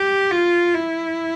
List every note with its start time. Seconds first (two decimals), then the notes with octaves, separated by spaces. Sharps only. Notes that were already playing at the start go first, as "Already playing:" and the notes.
Already playing: G4
0.31 F4
0.74 E4